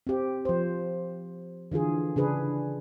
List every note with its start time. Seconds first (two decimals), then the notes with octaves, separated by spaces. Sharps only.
0.07 C4 G4
0.45 F3 C5
1.72 D3 E3 F4 G#4
2.16 C#3 D4 G#4 B4